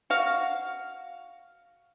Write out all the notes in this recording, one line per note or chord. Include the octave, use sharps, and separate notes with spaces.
F#4 F5